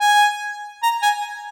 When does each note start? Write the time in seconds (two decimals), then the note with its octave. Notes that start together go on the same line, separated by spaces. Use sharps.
0.01 G#5
0.83 A#5
1.02 G#5